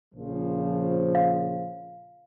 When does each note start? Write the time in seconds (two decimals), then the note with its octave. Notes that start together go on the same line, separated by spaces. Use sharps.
0.14 A#1 C#3 F3
1.15 F5